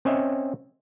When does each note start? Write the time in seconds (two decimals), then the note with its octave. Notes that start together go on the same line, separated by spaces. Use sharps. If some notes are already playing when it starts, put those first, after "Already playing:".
0.05 C4 C#4 C#5 D#5 E5